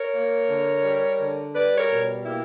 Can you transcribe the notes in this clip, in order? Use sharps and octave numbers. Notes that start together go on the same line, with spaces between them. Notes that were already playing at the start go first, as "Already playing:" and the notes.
Already playing: A#4 C#5
A#3
D3
G3
D3
G3 B4 D5
A#4 C#5
B2
A#3 E4 G4